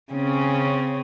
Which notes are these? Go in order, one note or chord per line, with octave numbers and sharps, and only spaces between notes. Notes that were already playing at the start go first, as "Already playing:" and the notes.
C#3 C4 C#4